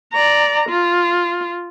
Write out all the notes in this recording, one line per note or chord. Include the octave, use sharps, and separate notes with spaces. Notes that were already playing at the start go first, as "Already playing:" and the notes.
D5 A#5
F4